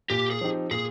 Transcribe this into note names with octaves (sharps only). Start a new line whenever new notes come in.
A#2 G4
G#4
F3 C4 D#4 G4
A#2 G#4